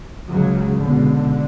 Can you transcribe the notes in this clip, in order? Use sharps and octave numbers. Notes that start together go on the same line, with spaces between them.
C#2 C#3 F#3
C#2 B2 D3